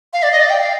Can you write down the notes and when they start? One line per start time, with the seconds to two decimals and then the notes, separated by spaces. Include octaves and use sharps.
0.13 F5
0.23 D5
0.32 D#5
0.40 D5
0.49 G5
0.61 F5